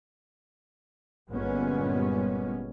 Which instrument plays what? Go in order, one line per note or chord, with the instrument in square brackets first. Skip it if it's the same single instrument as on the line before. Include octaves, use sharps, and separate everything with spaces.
[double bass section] G1 A#2 G3 G#3 B3 C#4